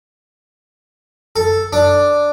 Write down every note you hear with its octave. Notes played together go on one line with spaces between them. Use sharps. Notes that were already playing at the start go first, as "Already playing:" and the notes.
A4
D4